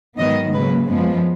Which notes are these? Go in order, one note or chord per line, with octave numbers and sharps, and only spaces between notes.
G#2 D#3 F#3 B3 D#5
C#3 F#3 A#3 B4
F#2 F3 G#3 B3